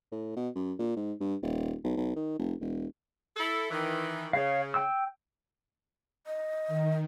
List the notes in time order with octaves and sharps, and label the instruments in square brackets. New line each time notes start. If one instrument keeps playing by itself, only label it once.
[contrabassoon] A2
B2
F#2
A#2
G#2
G2
D#1
B1
B1
D#3
F1
E1
[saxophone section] E4 A4
D#3 E3
[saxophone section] C#3 [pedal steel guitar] C#5 F5
[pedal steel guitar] G5 E6
[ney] D#5
[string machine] D#3